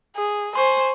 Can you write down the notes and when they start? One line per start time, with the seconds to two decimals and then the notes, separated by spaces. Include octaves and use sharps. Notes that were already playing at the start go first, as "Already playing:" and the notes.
0.16 G#4
0.55 C5 G#5 C6 C#6